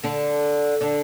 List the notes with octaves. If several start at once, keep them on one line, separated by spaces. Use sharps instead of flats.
D3 D4
D3 D4